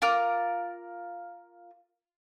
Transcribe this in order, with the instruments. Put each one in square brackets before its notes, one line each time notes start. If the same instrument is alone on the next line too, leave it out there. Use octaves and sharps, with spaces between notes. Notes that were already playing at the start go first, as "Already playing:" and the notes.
[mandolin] F4 A#4 D6 F6